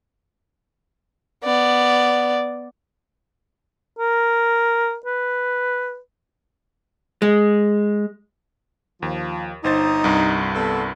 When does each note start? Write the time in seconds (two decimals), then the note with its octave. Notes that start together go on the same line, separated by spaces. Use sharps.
1.44 B3 D5
3.99 A#4
5.06 B4
7.22 G#3
9.02 D#2 F3
9.64 G1 D#4 C5 A6
10.04 C2 G2
10.55 B3 A4